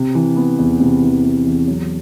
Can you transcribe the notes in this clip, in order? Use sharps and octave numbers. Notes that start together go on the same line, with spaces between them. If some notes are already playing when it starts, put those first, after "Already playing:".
Already playing: C3
E3
B3
E2
C3
E3
B3
E2
F#3